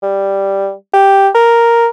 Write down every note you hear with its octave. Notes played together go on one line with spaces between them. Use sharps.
G3
G4
A#4